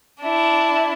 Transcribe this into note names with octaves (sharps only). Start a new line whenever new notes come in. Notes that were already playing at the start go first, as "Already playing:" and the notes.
D4 E4